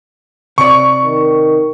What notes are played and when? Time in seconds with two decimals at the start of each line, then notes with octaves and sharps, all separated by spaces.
0.58 C3 D5 C#6
1.05 D#3